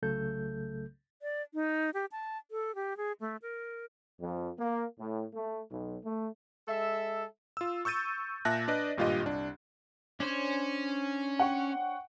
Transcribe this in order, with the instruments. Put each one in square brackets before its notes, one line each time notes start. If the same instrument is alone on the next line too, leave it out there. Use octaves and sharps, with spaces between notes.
[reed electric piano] C2 C#3 F#3 A3 A4 G6
[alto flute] D5
D#4
G4
A5
A4
G4
G#4
A3
A#4
[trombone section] F2
A#3
A2
A3
B1
A3
[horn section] G#3 A4 E5
[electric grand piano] F4 E6
C#6 E6 G6 A6 D#7
A#2 E5 A5 F#6 A#6
D4 B4 D5 D#5
G#1 G2 A#2 F4 G4 D#5
C2 D4
[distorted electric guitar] C#4 [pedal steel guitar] D4 C5 C#5
[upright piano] F#5 G5 C#6